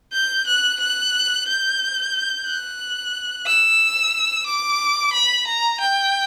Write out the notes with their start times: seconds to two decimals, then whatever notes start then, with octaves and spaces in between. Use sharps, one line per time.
0.13 G6
0.47 F#6
0.80 F#6
1.47 G6
2.46 F#6
3.46 E6
4.47 D6
5.13 B5
5.47 A#5
5.81 G5